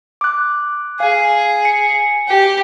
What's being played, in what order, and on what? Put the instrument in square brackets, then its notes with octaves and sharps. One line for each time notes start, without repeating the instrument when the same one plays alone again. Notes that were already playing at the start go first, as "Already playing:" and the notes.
[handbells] D6 F#6
[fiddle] G#4 [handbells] F5
[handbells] C#7
[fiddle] G4